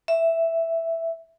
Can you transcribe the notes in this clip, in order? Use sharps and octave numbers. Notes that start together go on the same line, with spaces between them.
E5